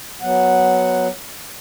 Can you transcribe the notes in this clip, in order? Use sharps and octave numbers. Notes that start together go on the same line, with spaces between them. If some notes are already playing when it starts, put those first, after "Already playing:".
F#3 B3 F#5